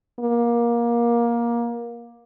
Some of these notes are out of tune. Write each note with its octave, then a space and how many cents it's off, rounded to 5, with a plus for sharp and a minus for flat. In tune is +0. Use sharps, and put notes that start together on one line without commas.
A#3 +20